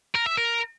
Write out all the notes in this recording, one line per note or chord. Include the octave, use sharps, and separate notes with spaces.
A#4
E5
A#4